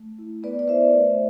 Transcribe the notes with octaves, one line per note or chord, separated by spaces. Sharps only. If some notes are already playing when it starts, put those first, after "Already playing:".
Already playing: A3
E4
B3 B4 D5
D5
E4 C5 E5
A3